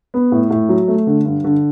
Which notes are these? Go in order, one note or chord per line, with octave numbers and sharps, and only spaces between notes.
B3
A2
A2
F#3
A3
D3
G2
D3